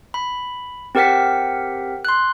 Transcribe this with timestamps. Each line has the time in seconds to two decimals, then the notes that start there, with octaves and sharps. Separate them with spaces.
0.14 B5
0.95 C4 G4 A#4 F#5 G5 B6
2.05 C6 F#6